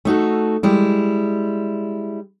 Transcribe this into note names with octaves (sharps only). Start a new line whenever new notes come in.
A3 D#4 F#4 A4
G3 G#3 E4